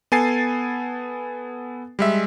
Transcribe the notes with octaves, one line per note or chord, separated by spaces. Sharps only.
B3 A4 G#5 A6 C7 D#7
G3 G#3 E5